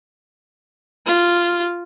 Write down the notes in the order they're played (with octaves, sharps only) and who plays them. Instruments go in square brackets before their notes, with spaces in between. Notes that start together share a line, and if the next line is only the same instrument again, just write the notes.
[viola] F4